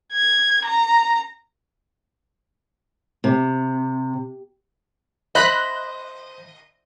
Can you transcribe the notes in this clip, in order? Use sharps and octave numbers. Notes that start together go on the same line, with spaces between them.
G#6
A#5
C3
C5 D#5 B5 F#6